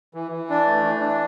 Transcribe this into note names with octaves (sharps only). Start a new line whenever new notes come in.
E3
E3
D4
A3
E3
D4